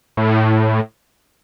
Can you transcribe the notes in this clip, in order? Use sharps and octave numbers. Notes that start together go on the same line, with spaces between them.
A2